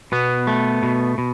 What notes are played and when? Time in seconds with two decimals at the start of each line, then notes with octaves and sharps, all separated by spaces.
0.12 B2 B3
0.47 A3
0.83 B2
1.18 B2